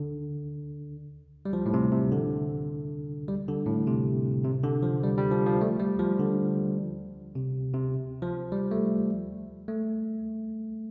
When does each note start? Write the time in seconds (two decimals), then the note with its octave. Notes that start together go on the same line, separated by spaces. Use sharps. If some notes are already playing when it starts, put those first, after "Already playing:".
Already playing: D3
1.45 G3
1.53 F3
1.66 A2
1.74 C3
1.92 C3
2.12 D3
3.28 G3
3.48 D3
3.66 A2
3.87 C3
4.45 C3
4.63 D3
4.83 F3
5.03 G3
5.18 G3
5.31 F3
5.46 F3
5.61 A3
5.80 G3
5.99 F3
6.19 D3
7.35 C3
7.74 C3
8.22 F3
8.52 G3
8.71 A3
9.68 A3